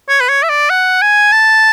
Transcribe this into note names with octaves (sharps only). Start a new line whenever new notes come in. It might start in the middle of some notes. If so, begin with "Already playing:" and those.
C#5
B4
C#5
E5
D5
F#5
G#5
A5